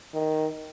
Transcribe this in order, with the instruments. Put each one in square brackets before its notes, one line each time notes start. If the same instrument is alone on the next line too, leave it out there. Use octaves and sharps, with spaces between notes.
[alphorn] D#3